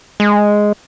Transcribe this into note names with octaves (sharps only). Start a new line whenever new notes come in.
G#3